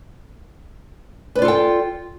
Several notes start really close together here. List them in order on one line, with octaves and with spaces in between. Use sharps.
B4 D5 F4 A4 G5